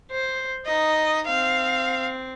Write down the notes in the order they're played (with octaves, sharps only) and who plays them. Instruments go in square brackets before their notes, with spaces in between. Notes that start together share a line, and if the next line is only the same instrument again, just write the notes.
[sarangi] C5
[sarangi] D#4 [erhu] D#5
[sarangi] C4 [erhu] F5